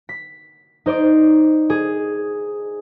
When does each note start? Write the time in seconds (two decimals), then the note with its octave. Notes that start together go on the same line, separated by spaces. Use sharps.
0.09 B6
0.86 D#4 C5 D5
1.70 G#4